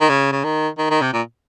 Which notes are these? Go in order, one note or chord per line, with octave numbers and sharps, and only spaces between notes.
D#3
C#3
C#3
D#3
D#3
D#3
C3
A#2